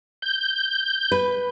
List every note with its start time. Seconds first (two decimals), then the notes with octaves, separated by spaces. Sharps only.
0.22 G6
1.12 B4